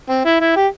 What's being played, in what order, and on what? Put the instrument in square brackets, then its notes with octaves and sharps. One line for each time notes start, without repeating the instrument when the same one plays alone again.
[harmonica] C4
E4
E4
G4